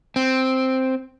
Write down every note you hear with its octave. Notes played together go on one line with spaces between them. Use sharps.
C4